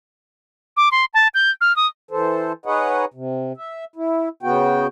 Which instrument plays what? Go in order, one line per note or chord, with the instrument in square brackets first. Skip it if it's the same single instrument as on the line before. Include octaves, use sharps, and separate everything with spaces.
[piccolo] D6
C6
A5
G6
F6
D#6
[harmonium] E3 A4 C5
D#4 G#4 B4 C#5 D#5 F#5
C3
E5
E4
C#3 B3 F#4 G5